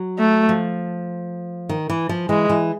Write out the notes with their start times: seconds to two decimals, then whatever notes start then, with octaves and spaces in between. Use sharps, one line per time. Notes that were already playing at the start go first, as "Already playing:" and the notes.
Already playing: F#3
0.19 A3
0.49 F3
1.69 D#3
1.90 E3
2.09 F3
2.29 E3 G#3
2.49 E3